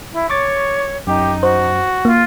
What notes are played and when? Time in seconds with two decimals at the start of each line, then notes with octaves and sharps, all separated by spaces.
0.13 E4
0.30 C#5 C#6 D6 A6
1.07 F#2 D#4 G4
1.43 F#4 C5
2.05 A#3 F4